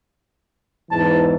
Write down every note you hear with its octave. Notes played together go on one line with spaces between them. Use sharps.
E2 G#2 E3 A5